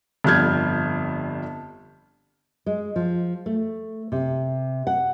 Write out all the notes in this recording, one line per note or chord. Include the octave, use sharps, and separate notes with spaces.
G1 F2 G3 F6 G6 G#6
G#3
F3
A3
C3
F#5